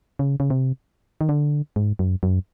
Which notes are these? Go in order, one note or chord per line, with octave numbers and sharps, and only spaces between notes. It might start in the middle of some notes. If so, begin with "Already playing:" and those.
C#3
C#3
C3
D#3
D3
G#2
F#2
F#2